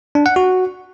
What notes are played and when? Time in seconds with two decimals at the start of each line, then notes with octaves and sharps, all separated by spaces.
0.15 D4
0.26 F#5
0.36 F#4